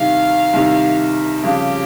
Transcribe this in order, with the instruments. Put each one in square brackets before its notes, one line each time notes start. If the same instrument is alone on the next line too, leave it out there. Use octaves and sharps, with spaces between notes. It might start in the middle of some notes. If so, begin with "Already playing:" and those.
Already playing: [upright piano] C2 C3 D#3 [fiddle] F5
[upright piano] C2 C3 D#3
[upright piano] F2 C#3 G3 C#4 F4 [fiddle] G4